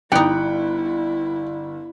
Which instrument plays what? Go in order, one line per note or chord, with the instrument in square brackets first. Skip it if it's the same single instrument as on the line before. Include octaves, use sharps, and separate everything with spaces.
[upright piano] G1 F#6 C#7 [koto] G3 D#4 [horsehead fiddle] E4 [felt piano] G5